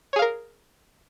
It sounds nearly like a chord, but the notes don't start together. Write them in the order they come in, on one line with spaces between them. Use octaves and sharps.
C#5 G#4 F5 A#4